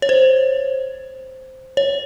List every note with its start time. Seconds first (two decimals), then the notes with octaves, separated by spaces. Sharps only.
0.02 C#5
0.09 C5
1.77 C#5